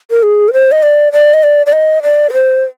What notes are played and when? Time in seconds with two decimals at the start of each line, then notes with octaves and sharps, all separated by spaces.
0.11 A#4
0.23 G#4
0.48 A#4
0.53 C5
0.72 D#5
0.83 D5
1.13 D5
1.34 D#5
1.43 D5
1.66 D5
1.73 D#5
2.03 D5
2.29 A#4
2.33 C5